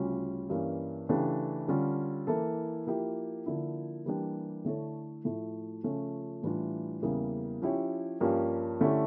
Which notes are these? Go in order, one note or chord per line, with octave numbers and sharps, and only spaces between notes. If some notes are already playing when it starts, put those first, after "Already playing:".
Already playing: D2 C#3 G3 C#4 F4
G2 E3 A#3 C#4
C#3 E3 A3 D4 G4
D3 G3 C#4 F4
E3 A#3 E4 A4
F3 A#3 E4 G4
D3 F3 A#3 E4
E3 G3 A#3 D4 G4
D3 A3 E4 A4 C#5
A2 F3 A3 E4
C#3 F3 A3 C#4 F4
A2 E3 G3 D4 F4
E2 C#3 G3 A#3 E4
F3 C#4 E4 G4 C#5
G2 F3 A#3 C#4 G4
D3 A3 C#4 E4 G4